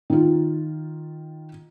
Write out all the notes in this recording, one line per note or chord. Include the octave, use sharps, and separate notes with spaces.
D#3 F4